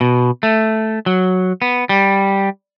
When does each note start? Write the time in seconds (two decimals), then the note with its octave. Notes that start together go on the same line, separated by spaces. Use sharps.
0.01 B2
0.43 A3
1.06 F#3
1.62 B3
1.89 G3